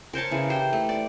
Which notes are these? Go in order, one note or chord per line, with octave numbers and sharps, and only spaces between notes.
A#4 C5 C#5 A5
C#3 E3
G4 C5
A3
D5